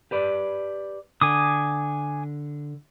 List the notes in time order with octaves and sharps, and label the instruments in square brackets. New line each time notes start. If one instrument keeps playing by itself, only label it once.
[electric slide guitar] G4 B4 D5
[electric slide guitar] D3 [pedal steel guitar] G#5 D6 D#6